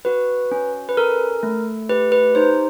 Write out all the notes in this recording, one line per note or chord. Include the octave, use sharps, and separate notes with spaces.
F#4 B4
C#4
B4
A4 A#4
A3
G4 B4
B4
D#4 C5